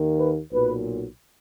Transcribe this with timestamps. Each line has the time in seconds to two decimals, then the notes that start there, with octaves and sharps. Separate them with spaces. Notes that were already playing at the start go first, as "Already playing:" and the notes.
Already playing: D#2 D#3 A#3
0.19 B4
0.53 B1 A#2 F#3 B4